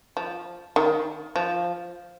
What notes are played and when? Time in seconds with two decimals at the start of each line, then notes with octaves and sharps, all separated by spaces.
0.17 F3
0.76 D#3
1.36 F3